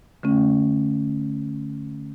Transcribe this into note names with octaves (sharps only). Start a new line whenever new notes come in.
D3 A3 C#4